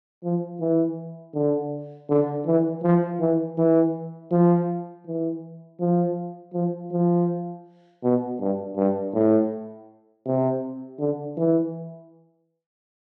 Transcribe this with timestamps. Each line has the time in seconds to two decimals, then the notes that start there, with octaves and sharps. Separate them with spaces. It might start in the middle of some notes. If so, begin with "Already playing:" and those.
0.23 F3
0.60 E3
1.34 D3
2.09 D3
2.46 E3
2.83 F3
3.20 E3
3.58 E3
4.31 F3
5.06 E3
5.80 F3
6.54 F3
6.92 F3
8.03 B2
8.39 G2
8.76 G2
9.13 A2
10.26 C3
10.99 D3
11.37 E3